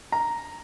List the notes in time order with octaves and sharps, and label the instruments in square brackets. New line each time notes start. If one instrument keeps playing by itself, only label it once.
[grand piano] A#5